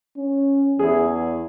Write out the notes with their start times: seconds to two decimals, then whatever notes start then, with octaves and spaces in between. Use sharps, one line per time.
0.17 C#4
0.79 E2 E4 G#4